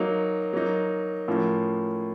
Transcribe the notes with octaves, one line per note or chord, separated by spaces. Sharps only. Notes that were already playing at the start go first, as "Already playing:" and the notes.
Already playing: F#3 A#3 D#4
F#3 A#3 D#4
A2 F3 A#3 C#4